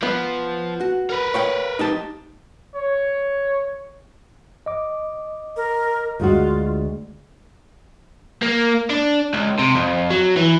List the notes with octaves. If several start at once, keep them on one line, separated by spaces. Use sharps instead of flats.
F3 B3
F#4
A#4 B4
C#5 F5 G5
D#4 G4 A5
C#5
D#5 D6
A#4
D2 G#3 F4 F#4
A#3
D4
C#2
C3
F2
F#3
E3